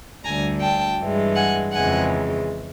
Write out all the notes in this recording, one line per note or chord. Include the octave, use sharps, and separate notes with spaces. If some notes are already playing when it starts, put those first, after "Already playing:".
D2 D3 G3 G#5 A#5
G5 A5
G2 E3 G#3
F#5 G#5
F2 C#3 E3 G#3 F#5 G#5